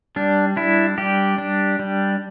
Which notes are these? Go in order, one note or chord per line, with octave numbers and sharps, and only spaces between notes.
G3 D4
D4 E4
G3 G4
D4
G3